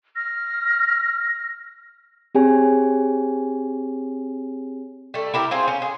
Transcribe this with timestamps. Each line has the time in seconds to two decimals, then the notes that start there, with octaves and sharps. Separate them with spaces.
0.16 F6 A#6
2.35 C4 G4 G#4 C#5 G#5
5.14 G3 A3
5.34 E4 G4 A#4
5.51 C4 F4 G#4 C5
5.68 C#4
5.82 G#4